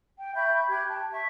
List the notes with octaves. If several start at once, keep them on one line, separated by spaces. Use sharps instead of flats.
G5
E5 B5 C#6 G6
G4 G5 F#6 G#6
G5 A5
E5 C#6